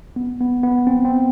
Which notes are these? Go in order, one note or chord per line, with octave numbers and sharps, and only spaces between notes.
B3
B3
B3
C4
C4